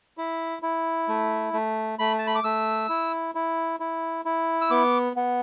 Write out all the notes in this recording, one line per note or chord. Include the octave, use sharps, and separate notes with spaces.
E4
E4
A3
A3
A3 B5
A5
B5
D6
A3 E6
E4
E4
E4
E4
E6
B3 D6
B3